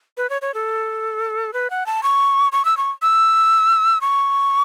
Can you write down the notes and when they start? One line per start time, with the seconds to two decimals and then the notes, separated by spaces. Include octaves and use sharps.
0.17 B4
0.30 C#5
0.42 C#5
0.54 A4
1.54 B4
1.70 F#5
1.86 A5
2.03 C#6
2.52 C#6
2.65 E6
2.77 C#6
3.02 E6
4.01 C#6